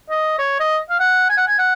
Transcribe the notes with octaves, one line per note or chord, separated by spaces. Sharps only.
D#5
C#5
D#5
F5
F#5
G#5
F#5
G#5
F#5